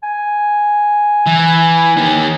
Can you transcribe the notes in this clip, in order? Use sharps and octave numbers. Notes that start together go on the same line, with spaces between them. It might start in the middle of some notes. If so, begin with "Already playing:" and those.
G#5
E3
D#3 G4